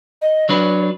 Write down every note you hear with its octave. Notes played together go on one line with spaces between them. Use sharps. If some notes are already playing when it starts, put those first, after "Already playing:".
D#5
F#3 D4 B4 C#5